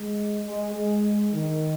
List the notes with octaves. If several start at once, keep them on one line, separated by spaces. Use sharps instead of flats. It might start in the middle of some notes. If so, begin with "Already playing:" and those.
Already playing: G#3
G#3
G#3
D#3